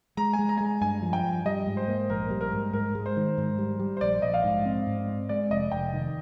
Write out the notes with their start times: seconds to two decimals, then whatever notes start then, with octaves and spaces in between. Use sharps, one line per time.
0.17 G#3 A#5
0.33 G#5
0.39 G#3
0.49 A#5
0.58 G#5
0.61 G#3 A#5
0.81 G2 G#5
1.02 F3
1.13 G5
1.24 G2
1.45 G3 D#5
1.67 G#2
1.77 C5
1.88 A#3
2.10 A#1 A#4
2.30 G3
2.41 A#4
2.52 G#2
2.73 G#2 A#4
2.95 G#3
3.06 C5
3.17 D#3
3.38 G#2
3.58 G3
3.79 G3
3.97 C5
4.01 A#1 D5
4.22 A#1 D#5
4.34 F5
4.44 G#2
4.66 C4
4.87 G#2
5.08 C4
5.29 G#3 D5
5.50 F1 D#5
5.72 F1 G5
5.94 D#3